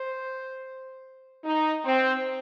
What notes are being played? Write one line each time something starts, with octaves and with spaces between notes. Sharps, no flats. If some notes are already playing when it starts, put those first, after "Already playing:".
Already playing: C5
D#4
C4